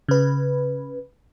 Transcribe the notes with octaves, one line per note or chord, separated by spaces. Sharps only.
C#3 B4